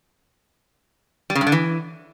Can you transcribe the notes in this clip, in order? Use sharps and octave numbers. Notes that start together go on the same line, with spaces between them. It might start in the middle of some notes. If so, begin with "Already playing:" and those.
G3
C#3
G2
D3
E3